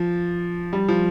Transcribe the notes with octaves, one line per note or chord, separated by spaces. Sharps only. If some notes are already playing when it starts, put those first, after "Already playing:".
Already playing: F3
G3
F3